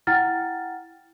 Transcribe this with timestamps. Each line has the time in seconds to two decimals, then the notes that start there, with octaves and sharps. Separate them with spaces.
0.07 E4 F#5 G5 A#5 F6 A6